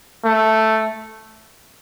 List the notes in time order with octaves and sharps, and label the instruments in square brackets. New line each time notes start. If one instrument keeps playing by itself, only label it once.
[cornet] A3